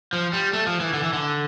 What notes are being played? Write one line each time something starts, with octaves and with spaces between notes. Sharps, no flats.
F3
G3
A3
F3
E3
D3
E3
D3